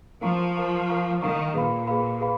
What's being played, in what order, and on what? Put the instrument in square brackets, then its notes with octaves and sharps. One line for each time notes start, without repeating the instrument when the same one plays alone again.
[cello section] F3 [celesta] A#4 F5 A#5 C#6
[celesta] A#4 F5 A#5 C#6
A#4 F5 A#5 C#6
[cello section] D#3 [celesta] A#4 F5 A#5 C#6
[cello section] A#2 [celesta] G#4 B4 F5 B5
[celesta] G#4 B4 F5 B5
G#4 B4 F5 B5